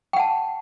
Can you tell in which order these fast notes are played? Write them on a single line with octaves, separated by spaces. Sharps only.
G5 F#5 A5